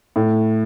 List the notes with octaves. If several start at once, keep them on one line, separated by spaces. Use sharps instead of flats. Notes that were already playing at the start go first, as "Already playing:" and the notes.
A2